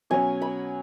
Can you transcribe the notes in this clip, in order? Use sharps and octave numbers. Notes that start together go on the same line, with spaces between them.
B2 F#3 C#4 G#5
B5